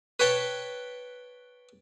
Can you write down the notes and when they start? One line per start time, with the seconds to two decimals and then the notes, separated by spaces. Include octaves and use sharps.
0.20 B4 C#5 G5 A5